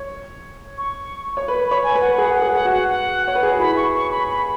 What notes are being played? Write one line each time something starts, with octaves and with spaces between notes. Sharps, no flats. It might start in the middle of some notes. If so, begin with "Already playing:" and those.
Already playing: C#5
C#6
C#5
B4 B5
B5
C#5
G#5
B4
F#5
G#4 F#5
F#5
G#4
F#5
F#4
F#5
F#5
C#5
B4
G#4
F#4
E4 B5
C#6
C#6
B5
B5